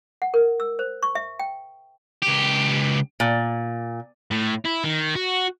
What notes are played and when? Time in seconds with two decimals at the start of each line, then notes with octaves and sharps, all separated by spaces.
0.22 F#5
0.34 A#4
0.60 E6
0.79 C5
1.03 C#6
1.15 E5
1.39 G5
2.22 C#2 G4
3.20 A#2
4.31 A2
4.65 E4
4.84 D#3
5.15 F#4